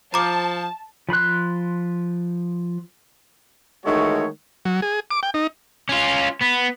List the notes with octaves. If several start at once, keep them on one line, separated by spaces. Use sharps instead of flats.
F3 A5 A#5 D6
F3 B5 C6 F#6
D#3 E3 G#3 A3 F#4 C#5
F#3
G#4
D6
G5
D#4
C#4 F4
B3